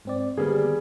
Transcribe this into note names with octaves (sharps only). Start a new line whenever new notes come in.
G#2 C4 D5
D3 D#3 G3 A#3 B3 G#4